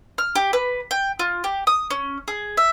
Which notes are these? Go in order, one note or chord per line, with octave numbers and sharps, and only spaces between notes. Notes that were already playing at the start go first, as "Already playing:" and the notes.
F6
G4
B4
G5
F4
G4
D#6
C#4
G#4
E5